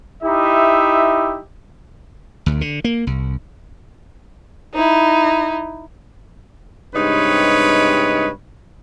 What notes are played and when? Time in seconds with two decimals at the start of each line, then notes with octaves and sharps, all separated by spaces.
0.23 D#4 E4 G4 E5
2.46 D2
2.61 D3
2.84 A#3
3.07 C2
4.74 D#4 E4
6.94 G2 C3 G#3 D#4 B4 C#5